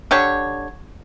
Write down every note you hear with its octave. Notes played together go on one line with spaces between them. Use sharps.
D3 G4 C#5